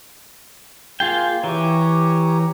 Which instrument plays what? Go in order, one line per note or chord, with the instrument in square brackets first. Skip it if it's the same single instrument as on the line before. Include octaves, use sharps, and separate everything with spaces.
[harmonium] A#3 [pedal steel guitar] F4 G#4 G5
[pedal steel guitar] E3 [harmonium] G4 C#5 A#5